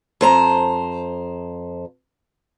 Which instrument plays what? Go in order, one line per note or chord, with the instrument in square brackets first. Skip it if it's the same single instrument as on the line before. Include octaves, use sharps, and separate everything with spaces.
[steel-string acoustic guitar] F2 C5 A#5